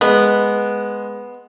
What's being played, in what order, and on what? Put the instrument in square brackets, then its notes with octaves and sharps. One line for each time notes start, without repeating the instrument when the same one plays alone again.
[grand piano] G#3 [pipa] B3